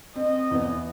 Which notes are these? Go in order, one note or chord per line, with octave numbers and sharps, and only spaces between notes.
C4 D#5
E2 B3